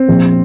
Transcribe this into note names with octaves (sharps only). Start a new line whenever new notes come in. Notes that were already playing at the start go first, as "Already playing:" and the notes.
Already playing: C4
A#1